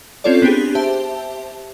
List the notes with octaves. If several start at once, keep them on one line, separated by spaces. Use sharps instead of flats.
C4 C#4 F4 A4 C#5 D5
B3 C4 D4 G4 G#4
G4 C5 E5 A5